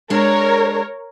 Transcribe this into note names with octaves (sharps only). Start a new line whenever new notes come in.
G#3 D4 A#4 C#5